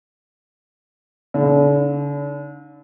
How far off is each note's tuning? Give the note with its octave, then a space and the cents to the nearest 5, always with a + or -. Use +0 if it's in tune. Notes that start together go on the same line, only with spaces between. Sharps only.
D3 -45 D#4 +0